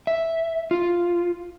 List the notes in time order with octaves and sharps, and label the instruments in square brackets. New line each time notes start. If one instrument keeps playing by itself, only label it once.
[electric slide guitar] E5
F4